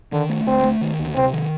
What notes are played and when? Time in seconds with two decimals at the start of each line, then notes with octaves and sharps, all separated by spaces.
0.12 D3 D#3
0.29 A3
0.46 D2 C4
0.64 A3
0.81 D#3
0.99 D2
1.16 C3 C4
1.33 D#3